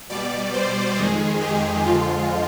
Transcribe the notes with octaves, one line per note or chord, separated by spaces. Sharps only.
B2 G3 D5
C5
F2 D#3 G#3 G#4
G4
F2 D3 F3 G#3 F4